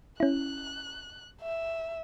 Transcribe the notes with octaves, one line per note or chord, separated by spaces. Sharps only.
C#4 E4 F#6
E5